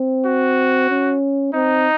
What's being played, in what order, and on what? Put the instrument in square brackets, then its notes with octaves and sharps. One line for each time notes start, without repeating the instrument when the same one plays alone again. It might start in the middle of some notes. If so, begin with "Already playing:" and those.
Already playing: [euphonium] C4
[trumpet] F#4
[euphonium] C#4
[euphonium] C4 [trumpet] D#4